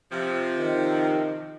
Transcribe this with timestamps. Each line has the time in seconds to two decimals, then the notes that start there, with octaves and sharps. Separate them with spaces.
0.11 C3 F3
0.58 D#3